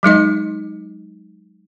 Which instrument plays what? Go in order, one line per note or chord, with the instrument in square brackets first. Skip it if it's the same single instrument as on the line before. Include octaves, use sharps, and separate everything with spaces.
[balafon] F#3 G#3 D#4 D#5